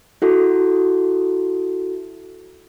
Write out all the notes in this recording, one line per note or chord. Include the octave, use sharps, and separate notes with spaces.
E4 F#4 A4